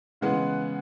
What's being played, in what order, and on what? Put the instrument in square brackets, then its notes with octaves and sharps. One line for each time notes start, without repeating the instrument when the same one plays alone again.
[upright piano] C#3 E3 G#3 B3 F#5